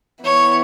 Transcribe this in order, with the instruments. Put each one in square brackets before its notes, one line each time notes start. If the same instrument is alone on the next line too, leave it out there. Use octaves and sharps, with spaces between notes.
[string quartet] E3 B3 E4 [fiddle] C#5